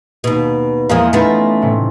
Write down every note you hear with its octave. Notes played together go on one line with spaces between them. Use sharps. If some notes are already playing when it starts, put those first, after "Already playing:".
D#2 B2
E2 F3 G#3 A#3 D#6
A3 B3 C#4 D#4 F4
A2 C3